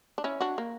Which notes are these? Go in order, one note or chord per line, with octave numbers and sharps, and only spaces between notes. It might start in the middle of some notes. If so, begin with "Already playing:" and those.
D4
C#4 E4
D4 F#4
A#3